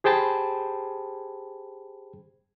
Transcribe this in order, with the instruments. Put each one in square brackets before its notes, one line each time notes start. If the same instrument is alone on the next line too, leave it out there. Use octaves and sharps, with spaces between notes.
[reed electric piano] G4 G#4 C5 G5 A5 B5